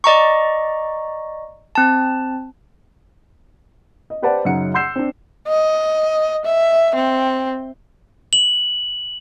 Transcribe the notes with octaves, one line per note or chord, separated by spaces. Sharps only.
D5 D#5 A#5 C#6
C4 A5
D#5
G4 B4 C5 D5 F#5 A5
F#2 C#3 D#4 F#5 C#7
F#5 C6 E6 G6 C7 E7
C4 D4
D#5
E5
C4
F#7